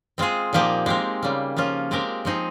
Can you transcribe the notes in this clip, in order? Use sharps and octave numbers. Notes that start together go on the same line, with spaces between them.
G#3 C4 F4 G#4
A#2 F3 A#3 D#4 G4
G#3 C4 G4 A#4
C#3 G3 A#3
F3 A#3 C#4 F4
G#3 C4 G4 A#4
F3 C4 D#4 G#4